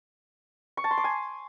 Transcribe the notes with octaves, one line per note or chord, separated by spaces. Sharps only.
C#6
A5
C6
D6
G#5